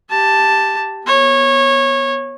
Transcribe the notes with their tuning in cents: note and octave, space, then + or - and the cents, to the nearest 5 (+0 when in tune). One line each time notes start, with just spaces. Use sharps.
G4 +0 A5 +0
B3 -10 C#5 -20